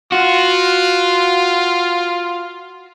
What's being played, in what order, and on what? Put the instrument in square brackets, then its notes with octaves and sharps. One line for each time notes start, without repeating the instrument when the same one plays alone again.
[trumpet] F4 [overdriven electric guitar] F#4